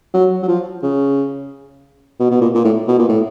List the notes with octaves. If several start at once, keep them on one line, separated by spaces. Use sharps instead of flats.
F#3
F#3
F3
C#3
B2
B2
A#2
A#2
A2
B2
A#2
A2